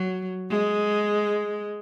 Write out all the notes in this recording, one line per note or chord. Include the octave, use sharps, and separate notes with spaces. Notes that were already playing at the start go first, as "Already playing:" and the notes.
Already playing: F#3
G#3